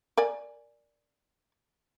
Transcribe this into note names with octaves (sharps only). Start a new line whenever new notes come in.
A#4 D5 G#5